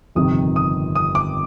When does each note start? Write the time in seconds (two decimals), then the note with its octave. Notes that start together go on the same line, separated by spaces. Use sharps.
0.15 G1 F2 C3 D#3 D#6
0.56 D#6
0.95 D#6
1.15 D6